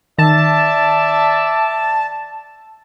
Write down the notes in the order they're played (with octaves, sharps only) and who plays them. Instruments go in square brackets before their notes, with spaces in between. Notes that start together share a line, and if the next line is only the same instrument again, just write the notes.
[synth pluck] D#3 [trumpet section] D5 E5 [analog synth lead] A5